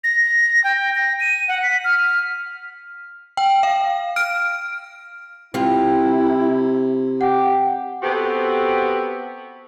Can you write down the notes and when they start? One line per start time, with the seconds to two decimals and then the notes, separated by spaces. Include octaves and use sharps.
0.04 A#6
0.64 G5
0.95 A#6
1.20 D#7
1.48 F#5
1.63 B6
1.85 F6
3.37 G5
3.63 F5
4.16 F6 D7
5.54 C3 C4 E4 F4
7.21 G4 F#5 G5
8.03 B3 C4 F#4 G4 A4